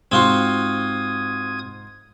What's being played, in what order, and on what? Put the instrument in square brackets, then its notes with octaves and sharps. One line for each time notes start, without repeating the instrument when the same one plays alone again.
[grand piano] G#2 C6 [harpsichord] C4 F4 F#4 [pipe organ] D#6 G#6